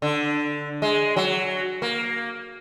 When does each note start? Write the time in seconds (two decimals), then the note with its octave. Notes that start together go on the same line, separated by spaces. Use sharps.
0.02 D3
0.82 G#3
1.16 F#3
1.82 A#3